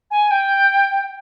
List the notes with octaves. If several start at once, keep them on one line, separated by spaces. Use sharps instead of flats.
G#5
G5